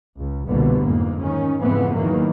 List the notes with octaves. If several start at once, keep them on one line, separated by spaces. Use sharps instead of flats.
C#2
G1 C2 B2 D3 A#3 B3
F2 G#2 A#3
D#3 C#4
F2 G#2 C#3 E3 B3 C4
E2 D#3 E3 F#3 A#3